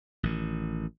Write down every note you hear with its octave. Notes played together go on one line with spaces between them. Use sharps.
A1 D#3